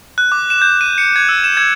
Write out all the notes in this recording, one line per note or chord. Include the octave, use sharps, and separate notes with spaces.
F#6
D6
E7
G6
D#7
C#7
G#6
E6
E7
G#6